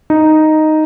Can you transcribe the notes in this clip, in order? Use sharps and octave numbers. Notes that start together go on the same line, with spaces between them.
D#4